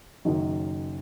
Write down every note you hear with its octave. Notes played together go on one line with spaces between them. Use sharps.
F#1 F#2 D#3 F#3